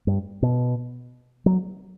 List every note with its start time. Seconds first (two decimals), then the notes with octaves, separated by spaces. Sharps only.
0.07 G2
0.42 B2
1.46 F#3